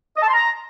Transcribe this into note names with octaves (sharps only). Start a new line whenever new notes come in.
D#5
A5
C6
A#5